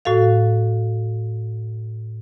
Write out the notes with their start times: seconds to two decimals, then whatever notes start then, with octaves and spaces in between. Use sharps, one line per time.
0.05 A2 F#4 A4 F5